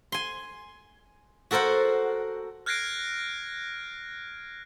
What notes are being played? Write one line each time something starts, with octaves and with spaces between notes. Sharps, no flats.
G#5 C6
F#4 A4 A#4 C5 F#5
F6 F#6 G#6 A#6 C7 D7